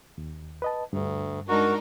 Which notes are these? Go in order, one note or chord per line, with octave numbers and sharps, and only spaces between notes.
D#2
B4 D#5 A5
D2 G2
G#3 D4 D#4 F#4 A#4